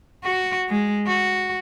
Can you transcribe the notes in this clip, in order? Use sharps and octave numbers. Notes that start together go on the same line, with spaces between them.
F#4
G#3
F#4